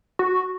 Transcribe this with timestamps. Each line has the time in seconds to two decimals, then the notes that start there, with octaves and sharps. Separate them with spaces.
0.19 F#4